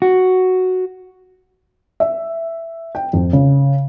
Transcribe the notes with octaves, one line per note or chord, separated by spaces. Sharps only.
F#4
E5
G5
F2
C#3